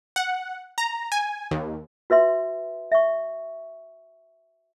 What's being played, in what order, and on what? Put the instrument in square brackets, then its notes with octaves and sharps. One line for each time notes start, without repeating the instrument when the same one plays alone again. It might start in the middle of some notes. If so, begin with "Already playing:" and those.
[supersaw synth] F#5
A#5
G#5
D#2
[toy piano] F#4 B4 E5 C6
E5 C#6